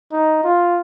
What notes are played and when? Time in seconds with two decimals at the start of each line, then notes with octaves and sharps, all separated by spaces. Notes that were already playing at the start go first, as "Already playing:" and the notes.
0.12 D#4
0.44 F4